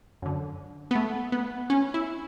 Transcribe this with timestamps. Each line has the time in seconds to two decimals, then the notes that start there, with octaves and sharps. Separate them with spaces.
0.22 F#2 D3
0.91 B3
0.95 A3
1.32 B3
1.70 C#4
1.94 E4